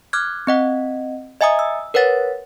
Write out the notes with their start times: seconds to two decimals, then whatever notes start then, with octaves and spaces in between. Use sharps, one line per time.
0.13 D6 F6 F#6 G#6
0.47 C4 D#5 F#5
1.41 D#5 E5 G#5 A#5 D#6
1.59 E6
1.94 A#4 B4 C#5 F#5 A6